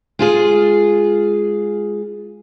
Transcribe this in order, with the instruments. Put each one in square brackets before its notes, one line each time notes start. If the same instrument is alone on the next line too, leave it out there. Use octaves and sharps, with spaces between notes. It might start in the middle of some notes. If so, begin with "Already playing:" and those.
[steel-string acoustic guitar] G#3 F4 G#4